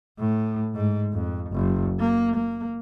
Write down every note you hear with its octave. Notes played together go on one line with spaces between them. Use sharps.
A2
G#2
F2
F#1
A#3
A#3